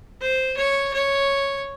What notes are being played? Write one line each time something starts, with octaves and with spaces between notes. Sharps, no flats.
C5
C#5
C#5